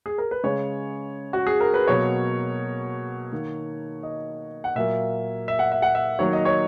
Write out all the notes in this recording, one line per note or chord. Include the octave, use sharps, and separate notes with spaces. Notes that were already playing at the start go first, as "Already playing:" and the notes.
G#4
A#4
B4
C#3 G#3 C#5
F#4
G#4
A#4
B4
B2 F#3 A#3 C#5
D#3 A#3
D#5
F#5
A#2 F#3 A#3 E5
E5
F#5
E5
F#5
E5
D#3 F#3 A#3 C#5
D#5
C#5